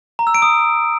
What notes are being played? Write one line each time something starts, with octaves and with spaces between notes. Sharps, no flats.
A#5
E6
D7
D#6